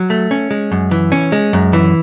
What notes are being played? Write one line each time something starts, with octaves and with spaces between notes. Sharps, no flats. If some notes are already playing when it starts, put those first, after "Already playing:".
Already playing: F#3
A3
C#4
G#3
F#2
E3
C#4
G#3
F#2
E3